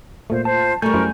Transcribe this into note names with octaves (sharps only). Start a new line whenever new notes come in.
A#2 A3 C5
F4 C5 A5
G3 A3 A#4 G#5 A#5 C#6 G6
F#2 E4 C5